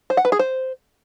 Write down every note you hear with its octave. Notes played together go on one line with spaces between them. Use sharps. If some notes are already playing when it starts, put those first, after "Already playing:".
C5
F#5
B4
G#4
C5